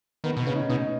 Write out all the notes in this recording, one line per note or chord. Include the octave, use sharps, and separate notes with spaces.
D#3 B3
B2
C#3 C#4
D#4
C#4
B2 D#4